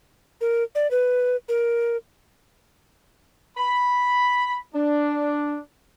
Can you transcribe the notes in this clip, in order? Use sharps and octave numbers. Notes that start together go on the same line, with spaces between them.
A#4
D5
B4
A#4
B5
D4